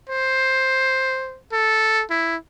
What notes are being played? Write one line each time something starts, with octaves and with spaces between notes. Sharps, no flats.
C5
A4
E4